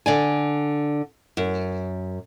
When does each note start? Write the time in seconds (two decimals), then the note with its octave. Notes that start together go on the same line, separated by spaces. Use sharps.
0.06 D3 D5 G#5
1.37 F#2